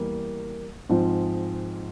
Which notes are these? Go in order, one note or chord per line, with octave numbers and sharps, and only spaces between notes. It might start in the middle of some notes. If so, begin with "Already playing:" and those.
Already playing: E2 E3 G3 A#3
G#2 F3 C4 F4